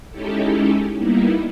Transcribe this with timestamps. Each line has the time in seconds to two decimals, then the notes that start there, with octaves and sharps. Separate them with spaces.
0.10 G#3 C#4 D#4 E4 G4 A4
0.96 G3 A#3 B3 D#4 E4